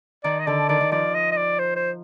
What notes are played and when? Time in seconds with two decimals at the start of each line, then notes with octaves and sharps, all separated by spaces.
0.24 D#3 D5
0.40 D#5
0.46 D3 D5
0.69 D#3 D5
0.81 D#3
0.92 F3 D5
1.15 D#5
1.32 D#5
1.37 D5
1.59 C5
1.76 C5